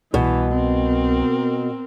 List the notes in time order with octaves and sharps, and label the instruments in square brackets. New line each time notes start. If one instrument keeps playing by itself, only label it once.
[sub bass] C2 [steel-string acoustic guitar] B2 [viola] E3
[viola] C4 A#4